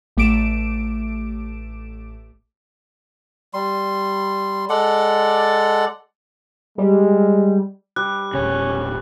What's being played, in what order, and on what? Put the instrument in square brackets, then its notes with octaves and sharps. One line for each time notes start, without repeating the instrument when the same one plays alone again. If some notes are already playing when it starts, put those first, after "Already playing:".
[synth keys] A1 A3 D6 D7 E7
[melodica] G3 C6
G#3 A4 D5 F#5
[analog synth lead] G3 [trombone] G#3
[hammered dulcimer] G3 [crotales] F#6
[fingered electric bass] D1 C#3 [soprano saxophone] C#4